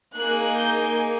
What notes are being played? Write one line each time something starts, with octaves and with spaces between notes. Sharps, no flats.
A#3 D#4 G#4 F#6
G6